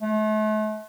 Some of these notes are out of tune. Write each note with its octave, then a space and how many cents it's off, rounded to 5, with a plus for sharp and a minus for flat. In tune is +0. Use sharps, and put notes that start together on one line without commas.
A3 -40